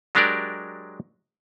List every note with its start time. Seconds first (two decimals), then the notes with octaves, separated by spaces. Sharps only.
0.15 F#3 G#3 D4 G4 A#4 D5